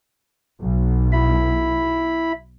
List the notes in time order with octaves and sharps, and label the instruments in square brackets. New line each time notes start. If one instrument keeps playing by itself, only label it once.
[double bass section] B1
[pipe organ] E4 B5